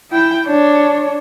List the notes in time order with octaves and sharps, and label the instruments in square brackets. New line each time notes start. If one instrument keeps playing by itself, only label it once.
[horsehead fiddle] E4 G5
D4 C#5